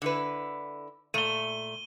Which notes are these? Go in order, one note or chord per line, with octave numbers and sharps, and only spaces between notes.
D3 E4 B4
A#2 A3 D#7 G7